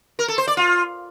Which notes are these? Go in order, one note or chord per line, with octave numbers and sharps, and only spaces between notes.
A#4
A4
C5
D5
F4